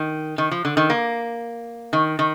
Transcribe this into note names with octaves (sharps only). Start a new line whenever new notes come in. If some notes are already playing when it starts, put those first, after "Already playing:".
Already playing: D#3
D#3
F3
D3
D#3
A#3
D#3
D#3